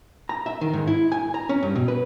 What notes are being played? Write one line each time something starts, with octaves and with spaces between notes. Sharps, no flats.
A#5
E5
D#3
G#2
E4
G#5
A#5
C#4
G2
B2
B4